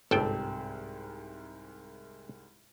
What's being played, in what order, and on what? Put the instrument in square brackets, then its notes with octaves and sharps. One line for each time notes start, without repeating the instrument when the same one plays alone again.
[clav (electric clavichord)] G1 G5 [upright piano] C2 G#2 [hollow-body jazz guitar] C4 G4 [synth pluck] A4